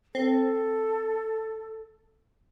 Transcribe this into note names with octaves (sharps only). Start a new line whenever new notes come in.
C4 A4